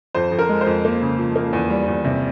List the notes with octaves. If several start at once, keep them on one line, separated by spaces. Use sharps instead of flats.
F2 C5
F2
A#4
G#3
C5
F2
A#3
C#3
F3
A#3
E2
G3
E2
C3